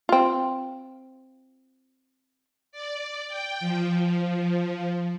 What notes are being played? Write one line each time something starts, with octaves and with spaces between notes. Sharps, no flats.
C4 F4
D5
G5
F3